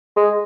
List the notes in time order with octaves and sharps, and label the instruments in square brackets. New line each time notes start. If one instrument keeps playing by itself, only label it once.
[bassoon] G#3